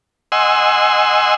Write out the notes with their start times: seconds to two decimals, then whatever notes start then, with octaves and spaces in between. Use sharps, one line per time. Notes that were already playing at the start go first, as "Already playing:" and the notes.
0.32 D#5 F#5 G#5 C6 E6